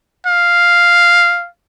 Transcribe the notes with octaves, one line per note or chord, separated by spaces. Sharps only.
F5